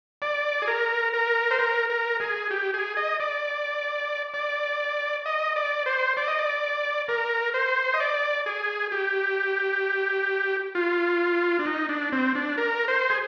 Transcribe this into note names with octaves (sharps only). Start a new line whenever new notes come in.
D5
G#4
A#4
A#4
C5
A#4
A#4
G#4
G4
G#4
D#5
D5
D5
D#5
D5
C5
D5
D#5
D5
A#4
C5
D#5
D5
G#4
G4
F4
D4
D#4
D4
C4
D4
A#4
C5
G#4